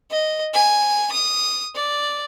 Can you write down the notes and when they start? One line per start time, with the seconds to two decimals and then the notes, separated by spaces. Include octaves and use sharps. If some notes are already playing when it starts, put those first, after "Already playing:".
0.11 D#5
0.53 G#5
1.12 D#6
1.76 D5